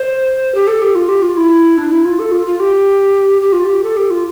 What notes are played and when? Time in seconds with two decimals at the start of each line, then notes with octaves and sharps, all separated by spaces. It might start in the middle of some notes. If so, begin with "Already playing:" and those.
Already playing: C5
0.55 G4
0.67 A4
0.82 G4
0.95 F4
1.09 G4
1.22 F4
1.37 E4
1.78 D4
1.91 E4
2.05 F4
2.19 A4
2.32 F4
2.47 F4
2.60 G4
3.42 G4
3.53 F4
3.64 G4
3.83 A4
3.97 G4
4.10 F4